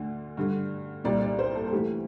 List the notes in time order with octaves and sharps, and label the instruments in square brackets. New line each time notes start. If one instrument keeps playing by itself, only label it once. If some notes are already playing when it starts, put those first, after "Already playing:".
Already playing: [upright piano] D2 D3
G2 D3
C2 A#2 D5
D5
C5
A4
A4
D2 C3 E3 G4